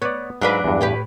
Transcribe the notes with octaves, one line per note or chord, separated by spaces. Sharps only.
B3 C#5 D5
G#2 F#3 D4 B4 F5
E2 G2
A2 G4 B4